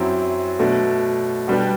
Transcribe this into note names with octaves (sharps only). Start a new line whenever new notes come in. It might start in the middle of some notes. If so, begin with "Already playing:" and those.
Already playing: F#2 F#3 C4 E4
B2 F#3 A3 D4
B2 G3 D4 G4 B4